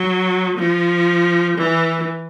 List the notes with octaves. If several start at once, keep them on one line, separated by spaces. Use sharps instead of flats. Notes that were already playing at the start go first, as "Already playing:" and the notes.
Already playing: F#3
F3
E3